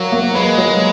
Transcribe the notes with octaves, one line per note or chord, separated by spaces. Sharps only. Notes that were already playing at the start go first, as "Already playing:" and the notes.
Already playing: F#3 F4 A#4 C#5
A#3
G#3 B4
F#3